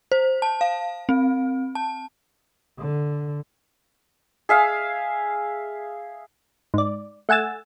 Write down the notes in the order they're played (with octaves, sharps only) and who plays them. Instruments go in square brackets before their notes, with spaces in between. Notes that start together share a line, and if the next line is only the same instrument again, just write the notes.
[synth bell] C5
A5
F5
C4
A5
[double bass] D3
[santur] G#4 E5 F5
[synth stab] G#2 D5
A3 F#5 G#5 E6 A6